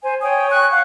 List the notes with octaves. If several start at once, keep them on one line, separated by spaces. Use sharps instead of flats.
C5 G#5
C#5 G5 G#5 D#6
G#5 C#6 F#6
F5 F#5